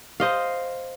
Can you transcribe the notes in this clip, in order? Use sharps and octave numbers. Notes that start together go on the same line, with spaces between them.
C5 D#5 F5